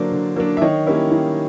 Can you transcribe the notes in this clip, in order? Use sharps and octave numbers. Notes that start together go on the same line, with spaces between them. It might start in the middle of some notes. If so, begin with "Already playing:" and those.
Already playing: D3 F#3 A#3 D4 C5 D5
D3
F#3 A#3 D4
E5
D#3 C#5 D#5
G3 A#3 C#4 E4
D#3